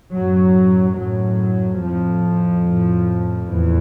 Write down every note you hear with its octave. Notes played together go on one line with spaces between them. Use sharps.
F#2 A2 F#3
F#2 A2 F#3
F2 A2 F3
A2
E2 A2 E3